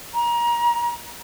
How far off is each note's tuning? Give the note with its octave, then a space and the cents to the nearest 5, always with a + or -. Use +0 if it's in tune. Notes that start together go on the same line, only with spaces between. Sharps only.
A#5 +25